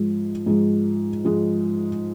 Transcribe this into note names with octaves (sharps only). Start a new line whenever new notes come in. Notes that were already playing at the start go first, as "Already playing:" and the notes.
Already playing: G#2 F3 G#3
G#2 F3 G#3
G#2 F3 G#3